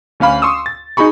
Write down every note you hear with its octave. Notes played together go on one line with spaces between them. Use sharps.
D2 C#4 F5 B5
C6 C#6 D#6 E6
A6
D#4 F#4 G#4 B5 C#6